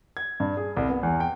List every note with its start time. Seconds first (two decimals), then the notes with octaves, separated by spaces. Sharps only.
0.17 G#6
0.40 G2
0.57 G#4
0.77 C2
0.89 B3
1.03 E2
1.20 G5